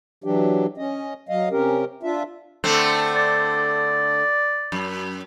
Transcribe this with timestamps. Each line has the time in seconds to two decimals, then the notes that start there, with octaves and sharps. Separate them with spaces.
0.24 E3 F#3 D4 G4
0.78 C#4 D#5
1.29 F#3 D#5 F5
1.50 C3 C#4 G4 A#4
2.03 D4 F4 E5
2.64 D3 A3 C4
3.16 D5
4.72 F#2